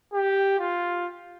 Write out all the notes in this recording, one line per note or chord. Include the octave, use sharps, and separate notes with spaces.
G4
F4